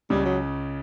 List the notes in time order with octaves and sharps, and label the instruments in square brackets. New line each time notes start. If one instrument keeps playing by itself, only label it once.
[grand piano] C#2 C#3 [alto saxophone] G3
[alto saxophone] F#3